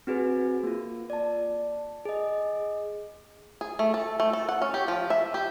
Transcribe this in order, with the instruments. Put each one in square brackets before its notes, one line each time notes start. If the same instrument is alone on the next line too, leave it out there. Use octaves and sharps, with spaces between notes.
[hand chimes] C4 F#4 G#4 B4
A#3 F4
D5 A5
G#4 D#5
[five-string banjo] G#4
A3
A4
A3
A4
F#5
C#4
G4
F3
E5
G4